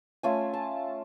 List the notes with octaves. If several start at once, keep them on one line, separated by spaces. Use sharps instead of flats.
A3 C#4 F4 G#5
A5